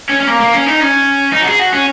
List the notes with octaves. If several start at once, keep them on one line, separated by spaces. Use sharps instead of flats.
C#4
C#4
A#3
A#3
C#4
D#4
C#4
D#4
F#4
G#4
F#4
C#4